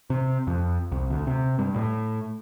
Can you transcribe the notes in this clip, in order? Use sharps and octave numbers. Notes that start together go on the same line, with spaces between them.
C3
F2
C2
D2
C3
G2
A2